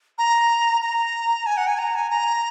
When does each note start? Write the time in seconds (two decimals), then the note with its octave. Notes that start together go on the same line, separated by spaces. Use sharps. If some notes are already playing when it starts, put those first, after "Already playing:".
0.18 A#5
0.82 A#5
1.46 G#5
1.57 F#5
1.67 G#5
1.78 A#5
1.95 G#5
2.10 A#5